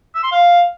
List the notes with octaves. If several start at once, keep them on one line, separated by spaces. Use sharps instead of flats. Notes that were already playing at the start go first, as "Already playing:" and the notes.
E6
C6
F5